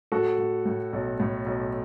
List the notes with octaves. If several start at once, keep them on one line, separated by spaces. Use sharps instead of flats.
A2 F#4 A4
A2
A2
B1
A2
B1